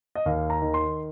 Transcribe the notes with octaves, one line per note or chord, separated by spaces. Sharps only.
D#5
D#2 F5
A#5
D#3
C6